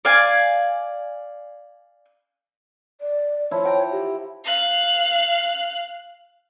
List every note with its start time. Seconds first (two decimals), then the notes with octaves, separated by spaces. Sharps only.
0.05 D5 F5 G#5
3.01 D5
3.51 F3 E4 C#5
3.64 F#5 G5 A#5
3.92 G4
4.44 F5 F#6